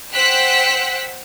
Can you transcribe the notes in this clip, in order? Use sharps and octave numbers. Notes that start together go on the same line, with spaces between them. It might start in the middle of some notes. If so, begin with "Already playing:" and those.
C5 F#5 G5 E6 F#6 B6